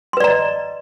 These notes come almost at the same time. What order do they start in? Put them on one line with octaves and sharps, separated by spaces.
C6 B4 D5 A#5 D#5